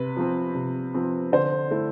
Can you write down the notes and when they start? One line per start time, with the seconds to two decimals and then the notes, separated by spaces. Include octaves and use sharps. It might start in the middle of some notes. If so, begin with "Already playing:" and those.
Already playing: C3 B4
0.17 F3 C4
0.55 C3
0.94 F3 C4
1.32 D3 C5
1.71 A3 E4